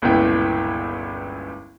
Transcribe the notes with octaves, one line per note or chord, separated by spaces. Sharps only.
G1 C#2 A#2 B3 E4 G5